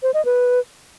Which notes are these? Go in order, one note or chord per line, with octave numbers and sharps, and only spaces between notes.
C5
D#5
B4